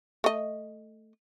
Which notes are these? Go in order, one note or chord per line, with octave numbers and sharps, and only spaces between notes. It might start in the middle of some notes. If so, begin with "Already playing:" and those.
A3 D#5